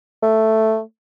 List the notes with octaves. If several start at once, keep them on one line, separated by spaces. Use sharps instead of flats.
A3